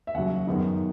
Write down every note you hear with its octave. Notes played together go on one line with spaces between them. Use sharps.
E5
D#2 C#3 F#3 F#5
F#2 D#3 G#3 B3 D#4